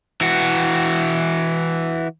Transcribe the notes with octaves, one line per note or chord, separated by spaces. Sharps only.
E3 F#4